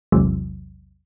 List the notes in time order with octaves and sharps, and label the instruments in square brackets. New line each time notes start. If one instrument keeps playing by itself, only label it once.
[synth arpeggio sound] A#1 E2 C3 E3 F#3 G#3